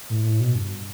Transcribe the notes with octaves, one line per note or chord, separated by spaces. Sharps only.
A2
A2
B2
G2